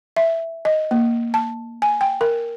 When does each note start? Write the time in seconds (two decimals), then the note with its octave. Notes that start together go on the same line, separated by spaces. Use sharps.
0.17 E5
0.65 D#5
0.91 A#3
1.34 A5
1.82 G#5
2.01 G5
2.21 A#4